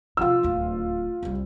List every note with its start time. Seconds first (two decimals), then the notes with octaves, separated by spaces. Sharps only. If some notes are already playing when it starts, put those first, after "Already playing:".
0.17 C3 F3 F4 E6
0.43 D1 D#2
1.23 C2 G3